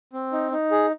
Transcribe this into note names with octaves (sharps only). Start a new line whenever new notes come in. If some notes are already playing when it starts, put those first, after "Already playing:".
C4
D#4
D#4
G#4